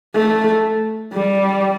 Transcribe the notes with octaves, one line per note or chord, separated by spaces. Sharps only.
A3
G3